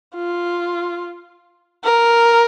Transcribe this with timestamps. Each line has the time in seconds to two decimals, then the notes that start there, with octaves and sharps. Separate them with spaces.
0.15 F4
1.84 A#4